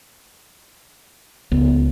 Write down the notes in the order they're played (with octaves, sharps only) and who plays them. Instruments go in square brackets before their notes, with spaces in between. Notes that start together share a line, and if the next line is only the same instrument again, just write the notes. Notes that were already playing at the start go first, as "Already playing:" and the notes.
[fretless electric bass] C#2 [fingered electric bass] B3